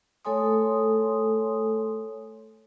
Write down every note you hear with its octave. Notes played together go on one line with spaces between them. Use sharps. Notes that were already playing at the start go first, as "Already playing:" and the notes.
A3 A4 C#5 G#5 C6 D#6